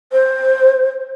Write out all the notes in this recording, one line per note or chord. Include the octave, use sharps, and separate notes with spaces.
C5